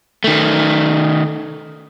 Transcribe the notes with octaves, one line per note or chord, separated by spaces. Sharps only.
D#3 A3